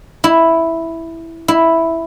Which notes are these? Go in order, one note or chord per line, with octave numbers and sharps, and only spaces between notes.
E4
E4